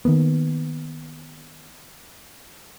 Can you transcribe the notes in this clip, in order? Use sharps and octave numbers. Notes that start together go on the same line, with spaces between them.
D#3 E3 A#3 B3